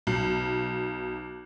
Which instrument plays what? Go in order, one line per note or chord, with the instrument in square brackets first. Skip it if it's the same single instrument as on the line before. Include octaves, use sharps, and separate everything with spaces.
[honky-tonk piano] B1